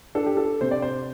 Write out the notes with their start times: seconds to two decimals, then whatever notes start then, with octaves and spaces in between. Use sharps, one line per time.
0.15 D4 A4
0.26 G4
0.37 A4
0.61 C3 C5
0.71 D5
0.82 C5